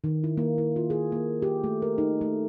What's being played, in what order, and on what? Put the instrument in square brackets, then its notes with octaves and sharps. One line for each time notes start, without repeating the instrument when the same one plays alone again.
[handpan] D#3
E4
A#3
E4
F4
G#4
A#3
G4
A3
A#4
D#4
A3